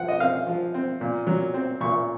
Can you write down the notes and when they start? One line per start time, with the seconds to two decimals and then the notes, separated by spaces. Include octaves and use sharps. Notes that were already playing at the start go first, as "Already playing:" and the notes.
Already playing: F3 F#5
0.08 D#5
0.20 C4 F5
0.47 F3
0.74 C4
1.01 A#2
1.27 F#3
1.54 C4
1.80 A#2 C#6